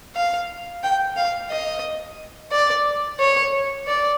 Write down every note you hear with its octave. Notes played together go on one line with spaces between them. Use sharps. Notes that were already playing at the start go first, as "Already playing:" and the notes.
F5
G5
F5
D#5
D5
C#5
D5